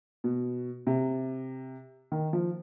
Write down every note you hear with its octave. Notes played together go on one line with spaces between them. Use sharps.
B2
C3
D#3
F3